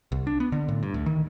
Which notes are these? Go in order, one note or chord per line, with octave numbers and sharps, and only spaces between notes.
C2
D4
B3
D3
A2
G2
D2
D#3